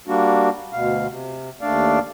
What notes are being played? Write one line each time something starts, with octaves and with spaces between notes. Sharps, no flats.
G3 A#3 D4 F#4
D2 B2 F5
C3
D#2 A3 D4 D5 F5